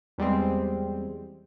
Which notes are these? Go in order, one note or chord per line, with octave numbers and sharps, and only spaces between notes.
E2 G3 G#3 C4